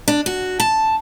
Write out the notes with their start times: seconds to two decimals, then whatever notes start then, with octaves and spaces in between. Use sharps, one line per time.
0.08 D4
0.26 F#4
0.60 A5